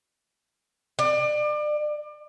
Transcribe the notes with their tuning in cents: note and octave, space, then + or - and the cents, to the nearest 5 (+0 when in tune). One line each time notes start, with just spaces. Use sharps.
D5 +30